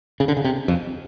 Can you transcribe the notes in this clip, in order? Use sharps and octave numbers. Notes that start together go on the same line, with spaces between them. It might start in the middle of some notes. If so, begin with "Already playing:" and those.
C#3
D3
C#3
C3
F2